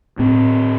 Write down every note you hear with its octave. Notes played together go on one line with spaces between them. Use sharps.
A2 C4